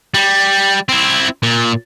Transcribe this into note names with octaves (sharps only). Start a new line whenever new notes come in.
G3
C4 E4
A#2